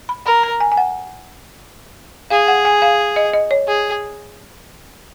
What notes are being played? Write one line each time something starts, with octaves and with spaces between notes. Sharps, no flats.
B5
A#4 B5
A#5
G#5
G#5
F#5
G#4 F5
F#5
G#5
F5
D#5
D#5
C#5
G#4